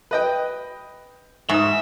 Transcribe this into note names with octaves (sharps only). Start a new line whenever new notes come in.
B4 D#5 G5
G#2 E5 C#6 D#6